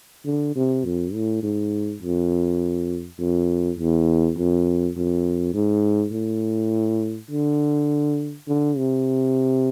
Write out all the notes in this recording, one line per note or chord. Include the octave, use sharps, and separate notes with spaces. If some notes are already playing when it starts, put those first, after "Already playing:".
D3
C3
F2
A2
G#2
F2
F2
E2
F2
F2
G#2
A2
D3
D3
C3